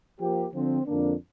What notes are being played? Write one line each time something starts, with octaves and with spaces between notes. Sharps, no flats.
F3 A#3 G4
D3 F3 C4
F2 D3 A#3 D4